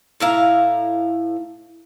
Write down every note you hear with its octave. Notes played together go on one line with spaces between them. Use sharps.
A2 E4 F5 A#5